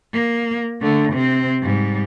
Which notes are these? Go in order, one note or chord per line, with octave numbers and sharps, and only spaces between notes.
A#3
D3 A3
C3 C4
G#2 G3